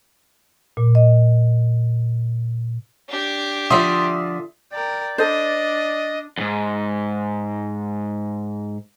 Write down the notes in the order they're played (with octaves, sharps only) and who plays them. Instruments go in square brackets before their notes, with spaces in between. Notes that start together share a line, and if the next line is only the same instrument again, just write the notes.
[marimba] A#2
D#5
[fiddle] D4 G4
[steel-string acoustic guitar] D3 F3 D5 [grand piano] E5 C6 D#6
[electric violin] A#4 G5 [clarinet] D5
[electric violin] D4 [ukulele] A4 C5 [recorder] D#5
[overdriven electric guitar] E2 G#2